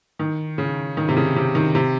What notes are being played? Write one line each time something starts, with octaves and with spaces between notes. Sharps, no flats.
D#3
C#3
D#3
C3
C#3
C3
D#3
C3